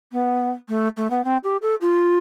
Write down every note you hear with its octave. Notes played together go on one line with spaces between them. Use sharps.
B3
A3
A3
B3
C4
G4
A4
F4